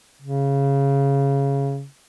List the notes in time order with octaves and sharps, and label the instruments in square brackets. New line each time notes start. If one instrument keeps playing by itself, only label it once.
[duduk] C#3